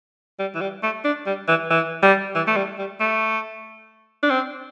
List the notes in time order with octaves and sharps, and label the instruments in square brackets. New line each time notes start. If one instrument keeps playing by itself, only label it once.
[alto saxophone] G3
E3
G3
A3
D4
G3
E3
E3
G3
E3
A3
G3
G3
A3
D4
C4